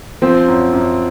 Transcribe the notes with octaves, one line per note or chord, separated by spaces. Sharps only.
F3 C4
F#2
F#2